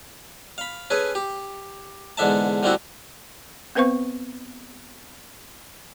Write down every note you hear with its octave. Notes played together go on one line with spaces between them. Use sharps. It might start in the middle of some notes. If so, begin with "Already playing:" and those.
F5 B5
C#4 G#4 A4 B4
G4
E2 G#2 D3 D4 E5 A5
D3 G3 A3 C4 E4 F#4
B3 C4 B4 C5 F5 C#6